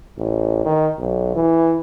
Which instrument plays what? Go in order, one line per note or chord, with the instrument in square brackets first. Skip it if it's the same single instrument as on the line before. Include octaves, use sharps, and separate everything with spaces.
[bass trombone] A1
D#3
B1
E3